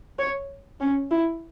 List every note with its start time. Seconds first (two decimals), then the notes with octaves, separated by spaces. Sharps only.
0.19 C#5
0.80 C#4
1.11 E4